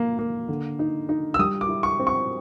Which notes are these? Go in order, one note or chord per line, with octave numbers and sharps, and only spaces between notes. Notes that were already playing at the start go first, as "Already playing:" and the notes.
Already playing: A#3
A#3
D3
D#4
D#4
E6
G3 D#6
D6
E4
C#6
C4
C#6